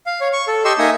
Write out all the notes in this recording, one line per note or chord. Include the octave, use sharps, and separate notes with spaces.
F5
C#5
C#6
A4
G4 D#5 C6 C#6 E6
A#3 D#4 E5 G#5 D#6